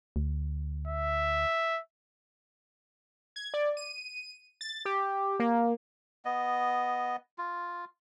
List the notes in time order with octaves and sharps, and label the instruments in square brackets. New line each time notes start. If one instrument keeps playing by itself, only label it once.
[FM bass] D2
[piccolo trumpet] E5
[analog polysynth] G#6
D5
D#7
A6
G4
A#3
[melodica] B3 D#5
F4